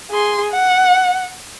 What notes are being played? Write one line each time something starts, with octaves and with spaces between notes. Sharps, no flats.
G#4 C6
F#5